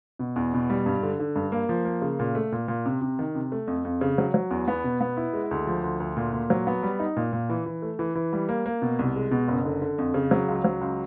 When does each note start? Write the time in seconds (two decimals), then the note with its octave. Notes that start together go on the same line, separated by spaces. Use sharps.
0.19 B2
0.36 E2
0.54 B2
0.70 G3
0.86 G2
1.03 D3
1.20 D3
1.36 G2
1.52 A#3
1.69 F3
1.85 A#3
2.02 C#3
2.19 A#2
2.35 A3
2.52 A#2
2.68 A#2
2.86 C3
3.01 C3
3.19 D#3
3.35 C3
3.52 A3
3.68 F2
3.85 F2
4.01 C#3
4.18 F#3
4.34 F#3
4.51 E2
4.68 B3
4.84 B2
5.01 B3
5.17 E4
5.33 G#3
5.51 D2
5.67 F3
5.84 D2
6.00 D2
6.17 A#2
6.33 A#2
6.50 F#3
6.67 B3
6.83 G3
6.99 D#4
7.17 A#2
7.33 A#2
7.50 E3
7.66 E3
7.82 A3
7.99 E3
8.15 E3
8.33 G3
8.49 A#3
8.66 A#3
8.82 B2
8.99 C2
9.16 G#3
9.31 B2
9.48 F#1
9.65 D3
9.82 D3
9.98 F2
10.14 C#3
10.31 F#3
10.48 C#2
10.64 F#3
10.81 C#2